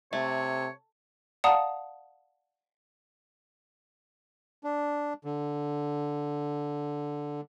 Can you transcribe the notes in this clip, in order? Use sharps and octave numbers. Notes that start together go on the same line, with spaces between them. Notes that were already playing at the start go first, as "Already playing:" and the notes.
C3 A3 C#5
D5 F5 F#5 A5 A#5 D#6
D4
D3